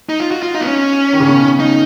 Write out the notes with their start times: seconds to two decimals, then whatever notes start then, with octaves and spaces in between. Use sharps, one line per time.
0.09 D#4
0.20 F4
0.31 F#4
0.43 F4
0.55 D#4
0.61 B3
0.66 C#4
1.13 D#3
1.20 C#3
1.27 B2 D#3
1.59 D#4